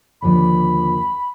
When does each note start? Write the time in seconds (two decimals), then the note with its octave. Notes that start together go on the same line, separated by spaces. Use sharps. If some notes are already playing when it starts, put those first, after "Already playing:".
0.22 D#2 D3 F3 B5